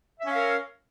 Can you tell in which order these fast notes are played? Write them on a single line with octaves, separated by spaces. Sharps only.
E5 C#4 F5 A#4